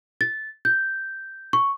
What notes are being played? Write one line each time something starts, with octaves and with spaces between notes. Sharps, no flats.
A6
G6
C#6